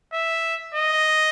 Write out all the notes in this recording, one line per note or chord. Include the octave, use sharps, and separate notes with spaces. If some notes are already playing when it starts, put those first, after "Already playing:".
E5
D#5